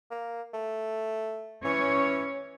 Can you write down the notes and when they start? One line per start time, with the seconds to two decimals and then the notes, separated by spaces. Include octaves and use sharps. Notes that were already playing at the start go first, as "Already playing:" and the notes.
0.11 A#3
0.54 A3
1.65 E3 C#4 C#5